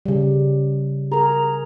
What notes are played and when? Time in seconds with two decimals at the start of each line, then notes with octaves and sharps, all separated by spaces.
0.06 C#3 G3
1.12 G#4 A#4 A#5